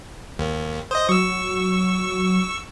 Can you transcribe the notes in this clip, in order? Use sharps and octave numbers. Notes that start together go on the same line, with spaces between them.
D#2
C5 D#5 D#6
F#3 C#6 E6